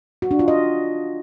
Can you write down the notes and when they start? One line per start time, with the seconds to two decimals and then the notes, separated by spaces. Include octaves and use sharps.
0.22 F#4
0.31 D4
0.39 F4
0.48 D#5